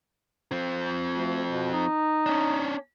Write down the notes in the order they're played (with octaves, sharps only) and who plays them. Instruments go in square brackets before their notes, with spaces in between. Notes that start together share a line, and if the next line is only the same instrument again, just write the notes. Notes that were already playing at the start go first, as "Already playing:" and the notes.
[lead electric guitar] F3 C4
[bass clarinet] D2
B2
D#4
[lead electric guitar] C#4 D4